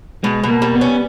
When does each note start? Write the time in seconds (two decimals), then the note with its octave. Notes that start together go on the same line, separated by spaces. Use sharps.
0.23 B2 G#3
0.44 B2
0.49 A#3
0.62 G3
0.75 B3
0.81 C#4